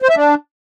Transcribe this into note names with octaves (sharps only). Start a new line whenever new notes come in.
C5
E5
D4